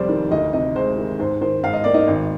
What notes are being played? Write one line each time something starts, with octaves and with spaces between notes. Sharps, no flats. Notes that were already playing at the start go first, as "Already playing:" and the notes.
Already playing: F1 F2 G3 C5 D5
D#3
D2 D#4 D#5
C3 D#4 D#5
G#3 C5
D#3
G#2 C5
D#3 C5
G#2 F5
D#5
A#3 D5
D#4 D#5
G#1